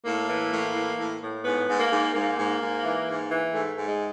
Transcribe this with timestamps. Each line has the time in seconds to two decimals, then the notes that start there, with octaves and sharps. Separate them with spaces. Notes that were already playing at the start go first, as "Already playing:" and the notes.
0.05 A2 A#3
0.28 E3
0.52 A2
0.75 E3
0.98 A2
1.21 A2
1.45 G#2 B3
1.67 G#2
1.79 A#3
1.91 G#2
2.14 G#2 A#3
2.37 G#2
2.60 G#2
2.83 E3
3.06 G#2
3.29 E3
3.53 G#2 A3
3.75 G#2
3.87 G#3